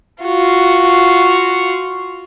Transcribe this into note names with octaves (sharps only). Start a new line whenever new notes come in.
F4 F#4